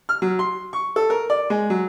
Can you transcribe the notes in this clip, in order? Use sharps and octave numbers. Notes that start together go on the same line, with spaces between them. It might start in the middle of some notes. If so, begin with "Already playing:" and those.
F6
F#3
C6
C#6
A4
A#4
D5
G#3
F#3